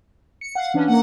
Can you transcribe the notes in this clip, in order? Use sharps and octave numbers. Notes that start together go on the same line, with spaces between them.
C#7
F5 F#5
E3 C#4 D4
A#3 F#5